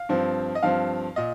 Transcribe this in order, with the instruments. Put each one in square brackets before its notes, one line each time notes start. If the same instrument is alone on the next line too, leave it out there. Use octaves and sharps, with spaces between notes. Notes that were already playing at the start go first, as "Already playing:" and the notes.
Already playing: [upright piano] F5
G2 F3 C4
D#5
G2 F3 C4 F5
A#2 D#5